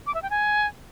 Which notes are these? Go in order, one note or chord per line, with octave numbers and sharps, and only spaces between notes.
D6
E5
G5
G#5